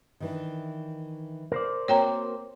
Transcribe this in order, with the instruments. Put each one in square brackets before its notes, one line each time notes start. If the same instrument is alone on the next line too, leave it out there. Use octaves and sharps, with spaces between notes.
[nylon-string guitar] D#3 E3 D4
[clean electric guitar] A#4 C5 D5
[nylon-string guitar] A#3 C4 F#4 [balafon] C#5 G5 A#5